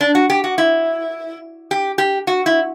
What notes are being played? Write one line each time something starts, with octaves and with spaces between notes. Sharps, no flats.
D4
F#4
G4
F#4
E4
G4
G4
F#4
E4